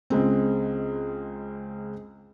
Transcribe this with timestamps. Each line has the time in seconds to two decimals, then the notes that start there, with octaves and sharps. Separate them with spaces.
0.10 C#2 G#3 C4